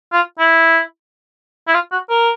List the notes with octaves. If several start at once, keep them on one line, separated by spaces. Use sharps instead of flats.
F4
E4
E4
F4
F#4
A#4